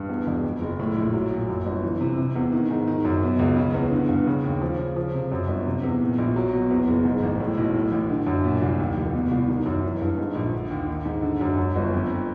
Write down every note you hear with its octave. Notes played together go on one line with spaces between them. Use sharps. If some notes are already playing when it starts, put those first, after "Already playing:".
Already playing: G2
E2
E1
F2
F#1
A2
A#1
F#3
A#2
F#2
G1
E3
C3
C3
E2
D#3
G#2
D#3
F#2
B2
C#2
C#3
E2
D3
G2
C#3
D#2
F3
C#3
F3
C3
F#2
G1
C3
E2
A#2
A#1
F#3
B2
E2
F#1
G#2
A1
A2
B1
A2
A1
D3
F#2
A#2
C2
D#2
F1
B2
C2
D#3
F#2
E3
G2
G#2
A#1
D3
D#2
D#3
G#2
D3
F#2
F#2
G1
F2